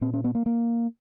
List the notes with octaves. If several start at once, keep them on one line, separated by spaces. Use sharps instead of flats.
A#2 C4
C#4
B3
A#3
A#3